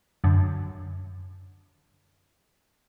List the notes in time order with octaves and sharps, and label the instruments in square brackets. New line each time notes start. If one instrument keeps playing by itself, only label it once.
[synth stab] F#2 D3